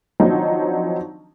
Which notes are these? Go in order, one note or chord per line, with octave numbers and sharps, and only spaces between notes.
D#3 F3 F#3 C4 D4 D#4